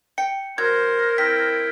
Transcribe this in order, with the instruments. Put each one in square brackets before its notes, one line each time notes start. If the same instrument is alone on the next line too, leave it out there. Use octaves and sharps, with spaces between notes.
[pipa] G5 [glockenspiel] C#7
[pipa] F#3 [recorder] A#4 [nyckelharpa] C5 [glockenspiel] G#6
[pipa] C4 [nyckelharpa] E4 G5 [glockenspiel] B6